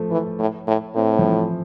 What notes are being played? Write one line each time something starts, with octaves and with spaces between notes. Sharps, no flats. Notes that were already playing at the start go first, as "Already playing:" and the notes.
Already playing: F3 A3
E3
A2
A2
A2 C4
F3
E3